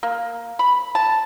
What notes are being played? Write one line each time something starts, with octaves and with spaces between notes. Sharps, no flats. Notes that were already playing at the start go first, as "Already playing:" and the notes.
A#3
B5
A5